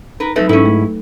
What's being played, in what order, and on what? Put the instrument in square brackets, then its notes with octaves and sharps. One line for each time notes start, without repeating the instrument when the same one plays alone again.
[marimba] D#4 [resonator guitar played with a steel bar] A#4 B4
[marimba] F#3 D#4 B4 [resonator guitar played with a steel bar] G#3 A3 C4
[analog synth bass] G#2 [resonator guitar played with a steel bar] C#4 E4 [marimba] D#4 A4
[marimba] A3